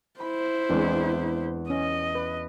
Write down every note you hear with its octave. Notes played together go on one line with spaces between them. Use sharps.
E4 C5 B5
E2 G#3 C4 D4
C#4 D#5
B4